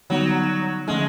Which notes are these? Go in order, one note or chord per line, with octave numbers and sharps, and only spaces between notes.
D3 F#3 G3 B3 D#4
D3 F3 G#3 A3 C#4